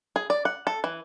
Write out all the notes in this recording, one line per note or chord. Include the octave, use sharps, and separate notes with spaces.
G#4
D5
F#5
A4
E3